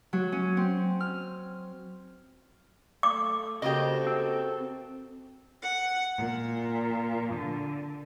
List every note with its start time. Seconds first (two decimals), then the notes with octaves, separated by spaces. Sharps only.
0.13 F#3
0.32 C#4
0.57 C4
1.00 F6
3.03 A3 D6
3.62 C#3 A#3 F#4 G4 A4 C5 D#5
4.07 C4
5.64 F#5
6.17 A#2
7.33 D3